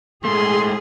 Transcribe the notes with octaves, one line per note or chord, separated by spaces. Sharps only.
G#2 A3 G#4 C6